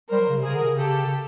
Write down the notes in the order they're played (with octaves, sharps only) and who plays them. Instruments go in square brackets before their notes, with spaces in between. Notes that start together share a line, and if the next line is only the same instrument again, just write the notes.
[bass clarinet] G3 [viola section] A#4 C5
[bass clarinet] F#3
C#3
C3
[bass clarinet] C#3 [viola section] G#4 A#4
[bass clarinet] D3
C3
C#3
[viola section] G4 A4
[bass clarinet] C#3